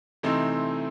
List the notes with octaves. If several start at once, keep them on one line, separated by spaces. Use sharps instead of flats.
C3 E3 A3 C4 D#4